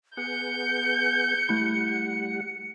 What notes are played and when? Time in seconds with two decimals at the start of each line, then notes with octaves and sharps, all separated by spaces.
0.17 B3 G#4 F#5 G6 C#7
1.49 G3 A3 E4 F#5 B5